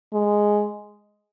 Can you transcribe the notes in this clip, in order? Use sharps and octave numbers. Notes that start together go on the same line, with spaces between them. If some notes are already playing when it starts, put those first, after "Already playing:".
G#3